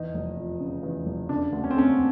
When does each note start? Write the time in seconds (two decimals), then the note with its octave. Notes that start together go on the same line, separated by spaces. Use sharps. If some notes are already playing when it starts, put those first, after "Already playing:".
Already playing: E2 D#4
0.14 F1
0.37 F3
0.60 C#3
0.83 E2
1.06 F1
1.29 C#3 D4
1.52 D2
1.64 C#4
1.71 C4
1.75 A3 C#4